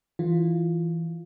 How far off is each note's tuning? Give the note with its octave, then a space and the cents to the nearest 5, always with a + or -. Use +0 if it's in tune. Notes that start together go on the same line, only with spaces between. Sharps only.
E3 +0 F4 +0